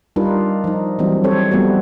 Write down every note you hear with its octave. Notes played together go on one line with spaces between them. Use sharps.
G3 D4 D#4 F4 A#4 B4
F3 D#4
E3 F#3 G3 C4 D4
G3 C4 A4 C5 C#5
F3 G3 A3 B3 F#4